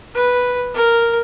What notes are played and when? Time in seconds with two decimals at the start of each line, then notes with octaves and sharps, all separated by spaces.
0.14 B4
0.74 A#4